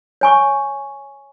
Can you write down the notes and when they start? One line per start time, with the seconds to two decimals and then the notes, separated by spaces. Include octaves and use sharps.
0.21 C#5 G#5 C#6